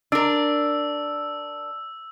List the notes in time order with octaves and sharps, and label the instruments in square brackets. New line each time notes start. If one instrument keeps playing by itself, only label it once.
[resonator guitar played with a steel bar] D4 A#4 [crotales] E6